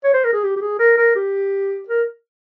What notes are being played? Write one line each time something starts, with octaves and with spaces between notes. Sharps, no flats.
C#5
C5
A#4
G#4
G4
G4
G#4
A#4
A#4
G4
A#4